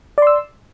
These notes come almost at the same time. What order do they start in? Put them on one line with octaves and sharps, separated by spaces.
D5 C6 E6